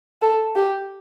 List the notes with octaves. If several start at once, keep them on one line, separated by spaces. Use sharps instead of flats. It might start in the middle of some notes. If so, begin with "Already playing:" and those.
A4
G4